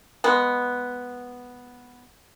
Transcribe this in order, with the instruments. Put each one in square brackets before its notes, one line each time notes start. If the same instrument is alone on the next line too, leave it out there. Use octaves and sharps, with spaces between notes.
[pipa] G#3 B3